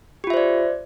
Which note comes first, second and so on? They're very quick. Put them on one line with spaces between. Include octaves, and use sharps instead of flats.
G4 F4 E5 C5 D5